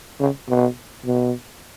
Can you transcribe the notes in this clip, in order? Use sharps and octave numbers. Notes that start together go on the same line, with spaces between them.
C#3
B2
B2